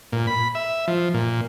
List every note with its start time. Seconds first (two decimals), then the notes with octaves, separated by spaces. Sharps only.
0.12 A#2
0.27 B5
0.55 E5
0.88 F3
1.14 A#2